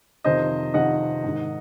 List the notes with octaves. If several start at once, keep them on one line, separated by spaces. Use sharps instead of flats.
F2 C3 D#3 C5 D#5
F2 C3 D#3 D#5 F#5
G#2 D#3